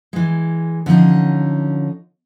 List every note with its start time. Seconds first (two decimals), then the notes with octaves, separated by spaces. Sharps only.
0.13 E3 G#3
0.86 D3 F3 C#4 D#4